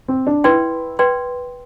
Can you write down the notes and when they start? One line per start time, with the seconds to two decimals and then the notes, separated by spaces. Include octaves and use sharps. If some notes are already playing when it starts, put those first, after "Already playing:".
0.08 C4
0.27 D4
0.44 E4 B4 D5 G5 C6
0.99 B4 D5 G5 C6